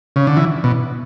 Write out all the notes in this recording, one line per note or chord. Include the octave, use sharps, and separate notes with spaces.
C#3
D3
E3
B2